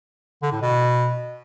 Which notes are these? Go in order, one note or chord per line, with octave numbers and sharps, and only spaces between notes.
D3
A2
B2